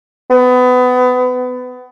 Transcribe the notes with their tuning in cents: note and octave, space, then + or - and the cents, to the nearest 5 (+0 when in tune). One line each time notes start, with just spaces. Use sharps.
B3 +25